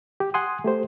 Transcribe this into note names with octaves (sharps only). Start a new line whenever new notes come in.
G4
F#5 G#5 C6 D#6
A3 G4 C5